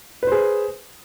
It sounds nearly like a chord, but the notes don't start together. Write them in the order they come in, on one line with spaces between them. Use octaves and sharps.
B4 C5 G#4